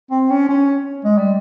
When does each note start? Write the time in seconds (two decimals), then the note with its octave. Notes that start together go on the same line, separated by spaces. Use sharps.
0.11 C4
0.30 C#4
0.49 C#4
1.04 G#3
1.18 G3